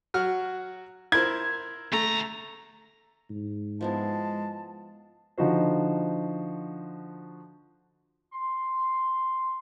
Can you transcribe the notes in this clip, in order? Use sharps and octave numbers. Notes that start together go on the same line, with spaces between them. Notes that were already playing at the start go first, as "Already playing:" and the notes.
F#3 F#4 F6
E4 A#4 C5 G#6
D2 A3 A#5
G#2
F3 G#3 B3 E4 A5
D3 F3 D#4 F#4 C5
C6